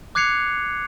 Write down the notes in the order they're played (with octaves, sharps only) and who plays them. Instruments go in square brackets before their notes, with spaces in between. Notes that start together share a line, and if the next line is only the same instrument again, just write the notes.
[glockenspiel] D6 F#6 G#6 C7 C#7 F7